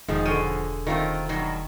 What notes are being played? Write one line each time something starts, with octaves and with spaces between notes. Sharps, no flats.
E1 B2 D#3 F3 G#3 D#4
D3 G#4 C#5 F5 G5 D#7
D#3 A3 C4 F4 A#4
G2 B2 D#3 F#3